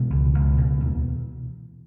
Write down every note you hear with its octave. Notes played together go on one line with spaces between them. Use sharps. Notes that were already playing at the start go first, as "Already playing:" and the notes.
Already playing: B2 E3 G#3
C#2
C#2
B2
D#2